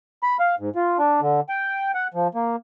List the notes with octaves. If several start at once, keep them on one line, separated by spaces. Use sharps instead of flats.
B5
F5
G#2
F4
D4
D3
G5
F#5
F3
A#3